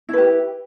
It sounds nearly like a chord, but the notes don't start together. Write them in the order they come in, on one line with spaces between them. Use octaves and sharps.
E4 B4 G4